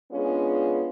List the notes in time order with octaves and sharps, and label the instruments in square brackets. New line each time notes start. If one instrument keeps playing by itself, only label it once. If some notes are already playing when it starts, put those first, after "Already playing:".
[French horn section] G#3 B3 C#4 D4 F4 G#4